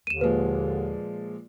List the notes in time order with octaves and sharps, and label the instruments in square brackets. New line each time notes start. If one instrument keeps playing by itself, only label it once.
[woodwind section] D#2 D3 [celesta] D#7 E7
[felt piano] A#2 F3 G#3 [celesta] B4